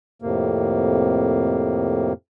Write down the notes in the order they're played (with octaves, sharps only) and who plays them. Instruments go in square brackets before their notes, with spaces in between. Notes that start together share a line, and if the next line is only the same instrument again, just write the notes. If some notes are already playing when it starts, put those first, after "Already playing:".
[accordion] F2 A2 C3 A#3